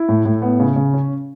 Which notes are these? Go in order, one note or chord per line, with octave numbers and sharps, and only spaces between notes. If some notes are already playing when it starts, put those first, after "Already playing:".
Already playing: E4
A2
A2
B3
C#3
C#3
C#4